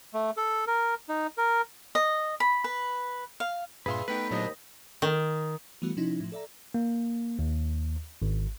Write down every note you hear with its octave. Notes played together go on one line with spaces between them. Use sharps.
A3
A4
A#4
D#4
A#4
D#5
B5
B4
F5
G2 A#2 G#4 B4 E5 F5 C6
A3 B3 D#4 B4 G5 B5
D#2 A#2 F#3 D4 C5 D#5
D#3
E3 G3 A3 B3 F#4
C3 F3 C#4 D#4 E4
A2 F3
A4 D5 E5 A#5
A#3
D#2
G#1